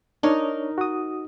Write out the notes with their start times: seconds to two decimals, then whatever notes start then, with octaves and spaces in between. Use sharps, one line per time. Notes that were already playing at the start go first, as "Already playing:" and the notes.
0.23 D4 D#4 A#4 C#5
0.78 F#4 D#6